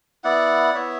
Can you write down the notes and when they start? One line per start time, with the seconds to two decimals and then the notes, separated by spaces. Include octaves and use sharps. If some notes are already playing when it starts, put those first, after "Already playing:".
0.24 B3 E4 D5 F#5
0.74 B3 E4 C#5 E5